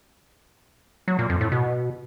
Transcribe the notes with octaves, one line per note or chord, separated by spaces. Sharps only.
F#3
A#2
F2
A2
B2